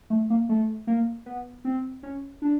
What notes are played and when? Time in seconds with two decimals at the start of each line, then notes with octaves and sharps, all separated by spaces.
0.10 A3
0.30 A#3
0.49 A3
0.87 A#3
1.26 B3
1.65 C4
2.03 C#4
2.42 D4